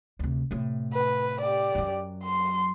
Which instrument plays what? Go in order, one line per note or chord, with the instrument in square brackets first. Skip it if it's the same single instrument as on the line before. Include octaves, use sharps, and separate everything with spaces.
[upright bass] D2 C3
A2 C3
[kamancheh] B4
G4 D5
[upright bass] F#2 F#3
[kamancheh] C6